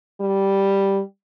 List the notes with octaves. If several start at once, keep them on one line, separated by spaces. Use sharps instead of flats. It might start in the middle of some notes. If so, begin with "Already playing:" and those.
G3